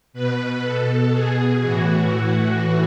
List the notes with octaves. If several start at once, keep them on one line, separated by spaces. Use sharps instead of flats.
B2 B4
B2 A4
B2 G#4
A2 E3 F#4
A2 E3 F#4